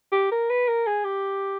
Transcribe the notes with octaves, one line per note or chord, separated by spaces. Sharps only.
G4
A#4
B4
A#4
G#4
G4